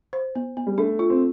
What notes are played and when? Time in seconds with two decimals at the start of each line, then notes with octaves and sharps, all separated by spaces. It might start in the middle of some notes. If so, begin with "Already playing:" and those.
0.13 C5
0.35 B3
0.57 B3
0.67 G3
0.78 A3 D4
0.99 F4
1.10 C4